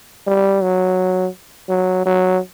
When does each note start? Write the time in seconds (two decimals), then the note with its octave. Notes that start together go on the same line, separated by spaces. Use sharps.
0.27 G3
0.63 F#3
1.69 F#3
2.06 F#3